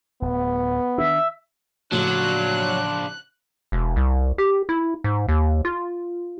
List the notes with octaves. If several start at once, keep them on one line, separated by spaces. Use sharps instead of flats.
D1 B3
D#3 D4 E5
A2 C#3 F3 F#3 D4 F4 F#6
E1
C2
G4
E4
G#2
D#2
F4